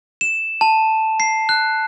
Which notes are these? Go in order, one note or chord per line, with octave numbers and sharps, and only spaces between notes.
E7
A5
C7
F#6